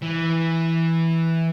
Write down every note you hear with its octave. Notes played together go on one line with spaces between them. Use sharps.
E3